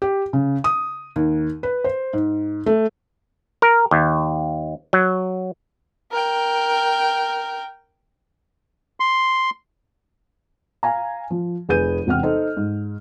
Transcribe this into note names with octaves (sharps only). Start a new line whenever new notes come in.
G4
C#3
D#6
D#2
B4
C5
G#2
A3
A#4
D#2
F#3
A#4 G5
C6
F5 G#5 A#5
F3
F1 G#4 B4 G6 D#7
E1 C3 C4 F#5 G5 F6
D#4 A4 C5
G#2